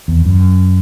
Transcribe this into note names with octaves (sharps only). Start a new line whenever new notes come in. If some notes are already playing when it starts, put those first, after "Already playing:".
E2
F#2